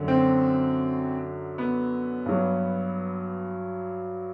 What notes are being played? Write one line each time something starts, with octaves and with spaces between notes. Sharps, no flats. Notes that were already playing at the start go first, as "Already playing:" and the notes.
Already playing: F#2 D3 F#3
C4
B3
G2 F#3